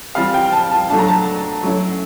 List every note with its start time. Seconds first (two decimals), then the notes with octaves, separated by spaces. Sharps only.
0.15 E3 G3 C4 F4 F5
0.34 G5
0.53 A5
0.71 A5
0.90 F#3 A3 D4 A5
0.99 A#5
1.08 A5
1.63 F#3 A3 C#4 E4